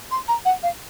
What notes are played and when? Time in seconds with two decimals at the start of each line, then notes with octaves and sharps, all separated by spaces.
0.11 C6
0.28 A#5
0.45 F#5
0.63 F5